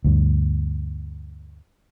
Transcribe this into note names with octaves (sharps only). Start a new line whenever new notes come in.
D2 G2